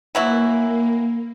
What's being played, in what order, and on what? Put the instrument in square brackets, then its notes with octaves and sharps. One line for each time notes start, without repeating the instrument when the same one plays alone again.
[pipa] E3 F#3 E4 [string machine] A#3